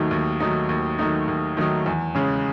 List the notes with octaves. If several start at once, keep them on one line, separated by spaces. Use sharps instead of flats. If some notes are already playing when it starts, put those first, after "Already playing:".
Already playing: D#2 D#3 F#3 A3 D#4
D#2
D#3 F#3 A3 D#4
D#2
D#3 F#3 A3 D#4
D#2
D#3 F#3 A3 D#4
E2
C#3 G#3 C#4